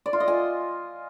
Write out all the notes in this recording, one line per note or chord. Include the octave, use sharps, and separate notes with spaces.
D5
F4
D#5
G#5